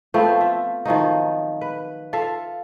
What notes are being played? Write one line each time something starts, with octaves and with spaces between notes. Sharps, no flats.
F3 A3 B3 C4
F4 E5
D#3 F3 F#3 D#4
B4
F4 A4 E5 F5